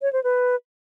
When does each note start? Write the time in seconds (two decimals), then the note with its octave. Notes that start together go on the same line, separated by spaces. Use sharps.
0.02 C#5
0.13 C5
0.24 B4